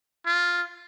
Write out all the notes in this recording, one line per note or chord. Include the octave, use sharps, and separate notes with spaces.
F4